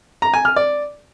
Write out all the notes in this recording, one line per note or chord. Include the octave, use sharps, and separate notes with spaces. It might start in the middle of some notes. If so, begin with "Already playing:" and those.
A#5
G#5
F6
D5